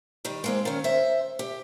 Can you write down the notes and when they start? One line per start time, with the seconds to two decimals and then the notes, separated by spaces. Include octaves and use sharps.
0.25 D#3 G3
0.44 G#3 A#3 C4
0.65 D#3 C#4
0.84 C5 E5
1.39 G4